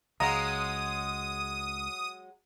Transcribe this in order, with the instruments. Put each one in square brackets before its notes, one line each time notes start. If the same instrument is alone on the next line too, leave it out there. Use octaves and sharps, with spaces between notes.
[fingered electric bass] C#2 [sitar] F#3 G#3 [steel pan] F5 A#5 [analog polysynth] D#6